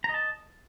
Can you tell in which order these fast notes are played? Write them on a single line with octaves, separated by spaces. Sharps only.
A#5 D#5 A5